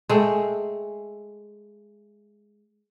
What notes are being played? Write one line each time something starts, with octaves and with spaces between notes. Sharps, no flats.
G#3 A3 G5